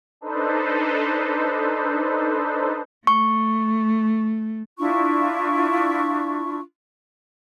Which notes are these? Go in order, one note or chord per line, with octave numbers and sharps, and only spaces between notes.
D4 D#4 A4 B4 C5
A3 C#6
D4 E4 F4 C#6